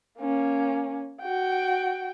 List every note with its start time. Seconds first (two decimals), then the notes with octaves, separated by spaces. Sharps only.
0.19 A#3 C#4
1.21 F#4 G5